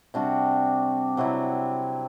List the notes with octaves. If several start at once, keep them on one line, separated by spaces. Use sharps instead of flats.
C3 G3 D4 F#4
C3 F#3 C4 E4